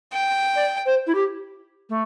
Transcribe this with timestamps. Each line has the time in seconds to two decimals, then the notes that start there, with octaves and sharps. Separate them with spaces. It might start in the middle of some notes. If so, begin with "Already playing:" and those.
0.13 G5
0.56 D5
0.86 C5
1.07 E4
1.15 G4
1.90 A3